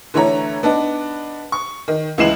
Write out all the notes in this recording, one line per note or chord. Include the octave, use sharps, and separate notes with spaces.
D3 E3 A3 C#5 A#5
B3 D4 D#4
C#6
D#3
C#2 E3 G#3 C7 E7 F#7